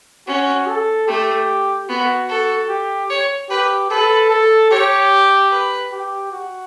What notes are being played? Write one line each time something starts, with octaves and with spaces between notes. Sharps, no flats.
C#4 F#4
A4
A3 G4
B3 F#4
A4
G4
C#5
G4 B4
A4 B4
A4
G4 C#5
B4
G4
F#4